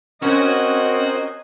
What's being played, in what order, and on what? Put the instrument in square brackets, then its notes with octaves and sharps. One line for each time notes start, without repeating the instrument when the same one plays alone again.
[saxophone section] C4 A#4 C5 [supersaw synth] C#4 F#6 G#6 [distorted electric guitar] F#4 [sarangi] D#5